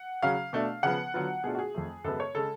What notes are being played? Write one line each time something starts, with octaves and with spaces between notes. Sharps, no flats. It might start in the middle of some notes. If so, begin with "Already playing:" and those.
Already playing: F#5
C#3 F#3 C#4 F5
B2 A3 D4
C#3 F3 B3 F#5
D3 F#3 B3 F4
B2 A3 D4 F4 G#4
F#4
G#4
F2 F3 A3
F#2 C#3 G#3 B3 A4
C#5
C#3 G#3 A4